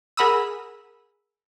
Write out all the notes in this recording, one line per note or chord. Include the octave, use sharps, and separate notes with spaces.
G#4 A#4 F#5 B5 D#6 E6